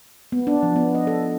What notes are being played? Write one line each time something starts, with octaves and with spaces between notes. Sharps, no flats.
B3
D4
F3
B3
D#5
A4